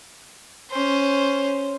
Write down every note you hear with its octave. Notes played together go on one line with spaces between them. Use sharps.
C#4 C5